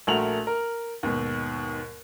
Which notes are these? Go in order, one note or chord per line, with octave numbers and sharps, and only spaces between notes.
A#1 A3 F#4 A#4 F7 F#7
A#4
D#2 G#2 B2